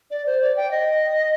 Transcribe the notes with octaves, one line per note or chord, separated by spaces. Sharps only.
D5
C5
D5
G5
D#5